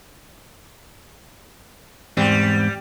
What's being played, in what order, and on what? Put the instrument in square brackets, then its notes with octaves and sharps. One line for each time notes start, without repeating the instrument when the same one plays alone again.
[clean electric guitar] E2 G#2 C4 [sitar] G3